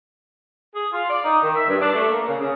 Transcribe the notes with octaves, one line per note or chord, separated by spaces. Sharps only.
G#4
F4
D5
D#4
D#3
E5
G2
D4
A3
A#3
C#3
C#3